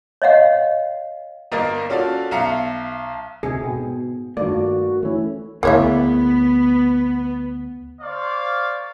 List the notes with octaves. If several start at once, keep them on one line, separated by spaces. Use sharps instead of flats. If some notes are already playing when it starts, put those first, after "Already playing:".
C#5 D#5 F5 F#5
G1 A#3 A#4 D#5 A6
C#4 F4 F#4 A4 D5
B1 E5 F5 A#5 C#7
D2 C3 A3 G#4
G#2 B2 G5
G2 D#3 A3 A#3 F4 F#4 D5
E3 A3 C#4 E4
D2 D3 A#3 B3 E4 G#4 C#5 E5
A#3 C5 D5 F5 C#6